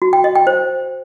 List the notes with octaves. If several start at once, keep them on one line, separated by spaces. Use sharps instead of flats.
F#4
G5
D#5
G5
C5